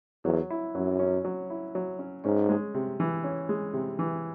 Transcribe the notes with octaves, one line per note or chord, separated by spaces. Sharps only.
E2 F#3
E4
F#2 F#3
C#4
F#3
E4
F#3
C#4
G#2 C#4
G#3
C3
E3
C#4
G#3
C3
E3